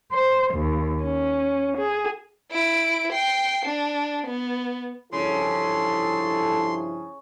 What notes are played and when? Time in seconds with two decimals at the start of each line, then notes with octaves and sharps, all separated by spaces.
0.13 C5
0.54 D#2
1.02 C#4
1.77 G#4
2.51 E4 D7
3.12 G5 C7
3.66 D4
4.27 B3
5.13 G2 C#3 F3 E4 A4 C6